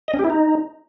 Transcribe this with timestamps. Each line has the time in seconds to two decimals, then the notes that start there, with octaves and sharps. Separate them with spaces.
0.08 D#5
0.14 C#4
0.19 G4
0.24 E4
0.30 D#4